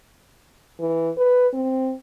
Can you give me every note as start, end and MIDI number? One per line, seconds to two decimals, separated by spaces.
0.80 1.10 52
1.17 1.48 71
1.53 1.94 60